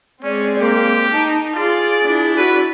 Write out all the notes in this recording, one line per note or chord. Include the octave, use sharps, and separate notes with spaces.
G#3 C4 C#4 D5
A#3 G4
D#4 A5
F4 G#4 D5
D4 E4
F#4 B4